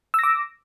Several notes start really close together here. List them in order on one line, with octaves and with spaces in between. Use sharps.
E6 A#6 D6